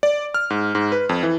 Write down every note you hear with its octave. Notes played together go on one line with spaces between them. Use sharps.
D5
F6
G#2
G#2
B4
F2
E3